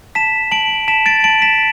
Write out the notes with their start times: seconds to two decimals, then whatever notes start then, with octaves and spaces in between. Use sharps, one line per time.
0.15 A5 B6 E7
0.52 A5 D7 F#7
0.88 A5 B6 E7
1.06 A6 D7
1.24 A5 D7 F#7
1.42 B6 E7